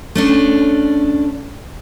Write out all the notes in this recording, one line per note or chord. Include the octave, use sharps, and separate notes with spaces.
A3 C#4 D4